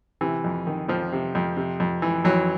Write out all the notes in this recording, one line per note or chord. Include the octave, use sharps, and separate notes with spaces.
C3 E3
F2
D#3
F2 F3
C3
F2
C3
F2
E3
F2 E3 F#3